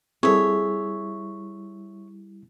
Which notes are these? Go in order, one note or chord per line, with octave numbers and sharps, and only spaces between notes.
G3 C4 E4 G#4 A4 C#5 E5